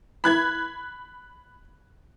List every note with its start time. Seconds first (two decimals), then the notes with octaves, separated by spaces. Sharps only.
0.24 B5 F#6 G#6